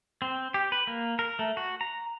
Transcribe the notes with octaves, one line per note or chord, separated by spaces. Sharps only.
C4
G4
B4
A#3
A#4
A3
F#4
A#5